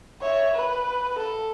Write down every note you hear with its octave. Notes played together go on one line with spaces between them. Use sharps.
C#5 E5
B4
A4